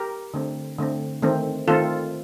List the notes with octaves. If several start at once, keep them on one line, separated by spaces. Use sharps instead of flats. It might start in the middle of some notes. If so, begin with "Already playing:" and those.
Already playing: G4 A#4
D3 A3 C4
D3 A3 C4
D#3 A3 C4
D#3 A3 C4 F4 A4